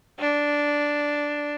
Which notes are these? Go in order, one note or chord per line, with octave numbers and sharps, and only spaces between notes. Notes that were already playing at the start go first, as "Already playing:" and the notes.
D4